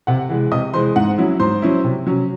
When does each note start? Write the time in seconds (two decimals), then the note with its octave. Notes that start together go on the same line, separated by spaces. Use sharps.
0.07 C3 F#5
0.29 E3 G#3
0.52 C3 D#5 D#6
0.74 E3 G#3 C5 C6
0.96 G#2 F#5
1.18 F#3 C#4 E4
1.39 G#2 C5 C6
1.62 F#3 C#4 E4
1.84 C3
2.07 F#3 C#4